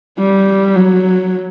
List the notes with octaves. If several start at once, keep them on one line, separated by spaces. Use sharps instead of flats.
G3
F#3